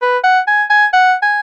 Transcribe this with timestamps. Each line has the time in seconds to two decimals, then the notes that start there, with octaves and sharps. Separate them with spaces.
0.02 B4
0.24 F#5
0.48 G#5
0.70 G#5
0.93 F#5
1.22 G#5